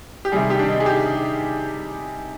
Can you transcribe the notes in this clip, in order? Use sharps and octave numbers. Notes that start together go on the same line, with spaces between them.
G4
C3 D#3 G3 G#4
G4
D4
D#4
G#4
G4